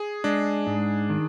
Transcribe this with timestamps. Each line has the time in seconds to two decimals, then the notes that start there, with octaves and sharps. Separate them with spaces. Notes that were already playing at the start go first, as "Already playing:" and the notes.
Already playing: G#4
0.24 G#3 D4
0.67 G#2
1.10 D#3